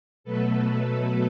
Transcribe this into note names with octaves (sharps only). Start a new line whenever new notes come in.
B2 F#3 A3 A4 B4